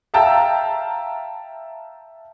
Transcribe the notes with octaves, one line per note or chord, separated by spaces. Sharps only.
E5 F5 G5 A5 A#5 E6